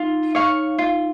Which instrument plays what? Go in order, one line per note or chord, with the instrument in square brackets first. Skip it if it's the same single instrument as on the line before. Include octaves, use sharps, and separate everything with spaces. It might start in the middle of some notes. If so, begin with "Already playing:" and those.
Already playing: [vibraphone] D#4 [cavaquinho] F4
[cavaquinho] C#5 F5 C#6
F4